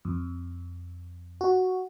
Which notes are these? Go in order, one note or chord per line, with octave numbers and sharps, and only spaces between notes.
F2
F#4